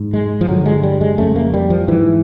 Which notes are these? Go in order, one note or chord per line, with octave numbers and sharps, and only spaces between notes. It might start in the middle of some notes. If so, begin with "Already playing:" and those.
Already playing: G#2
G#3
F3
G2 D3 F#3
G#3
G3
G#3
F2 C#3 A3
A#3
G3
F3
G#2 E3